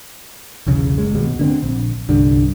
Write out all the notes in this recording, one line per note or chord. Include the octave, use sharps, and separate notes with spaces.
B1 E2 C#3
F#1 G#3
D#2 B2
D3 A#3 C4
A#1
C2 G2 D3